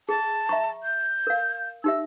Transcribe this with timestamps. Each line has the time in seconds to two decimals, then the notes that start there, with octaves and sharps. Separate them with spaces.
0.09 G#4 A5
0.49 E5 A#5 C#6
0.83 G6
1.27 A#4 F5
1.84 D#4 G4 E5 E6